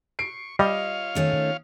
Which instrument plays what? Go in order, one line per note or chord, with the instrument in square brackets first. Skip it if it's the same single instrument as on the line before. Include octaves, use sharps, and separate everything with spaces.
[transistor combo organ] C#6 [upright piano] C7 D7
[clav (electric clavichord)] G3 [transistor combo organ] F4 C#5 F5 [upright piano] D#5
[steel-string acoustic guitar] D#3 A3 C#4